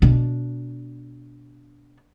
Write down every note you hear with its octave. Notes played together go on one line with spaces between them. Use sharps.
B2 D4